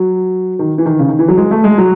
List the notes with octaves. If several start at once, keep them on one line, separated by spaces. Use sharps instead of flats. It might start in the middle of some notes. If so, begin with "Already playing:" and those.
Already playing: F#3
D#3
E3
D#3
C#3
D#3
E3
F#3
G#3
A3
G#3
F#3